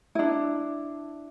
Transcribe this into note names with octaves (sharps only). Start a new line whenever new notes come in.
D4 E4